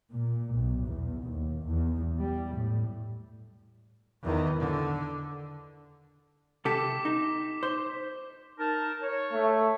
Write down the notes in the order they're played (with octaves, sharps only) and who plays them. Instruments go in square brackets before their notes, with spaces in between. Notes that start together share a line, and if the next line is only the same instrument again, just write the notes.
[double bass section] A#2
B1
E2
D#2
E2
G3
A2
[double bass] E2 D#3
D3
[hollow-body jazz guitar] C3 G4 A4 [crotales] D6 B6 E7
[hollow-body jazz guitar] D#4
C5
[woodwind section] D#4 A#4 A5
C#5
[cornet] A3